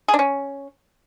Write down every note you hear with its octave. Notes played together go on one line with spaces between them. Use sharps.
G#4
D4
C#4